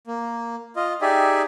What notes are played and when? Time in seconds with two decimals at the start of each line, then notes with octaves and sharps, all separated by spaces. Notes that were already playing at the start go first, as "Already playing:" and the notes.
0.07 A#3
0.76 F4 D#5
1.02 D#4 G4 G#4 D5 E5